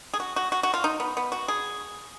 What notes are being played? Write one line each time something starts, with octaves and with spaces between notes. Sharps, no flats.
G#4
F#4
F#4
F#4
F#4
F4
D#4
B3
B3
F#4
G#4